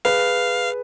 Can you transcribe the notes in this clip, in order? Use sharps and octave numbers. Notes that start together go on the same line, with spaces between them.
G#4 B4 F5